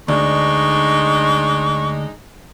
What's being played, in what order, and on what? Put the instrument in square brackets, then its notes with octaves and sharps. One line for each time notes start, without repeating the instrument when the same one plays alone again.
[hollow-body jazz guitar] D2 [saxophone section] G#3 D4 D#4 [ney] C#6